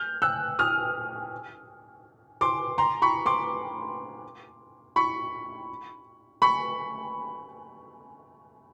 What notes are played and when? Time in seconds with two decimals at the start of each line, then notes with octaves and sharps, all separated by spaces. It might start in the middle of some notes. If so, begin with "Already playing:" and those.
Already playing: F6 G6
0.22 E6 F#6
0.59 D#6 F6
2.41 C6 D6
2.78 A#5 C6
3.02 B5 C#6
3.26 C6 D6
4.96 B5 C#6
6.42 B5 C#6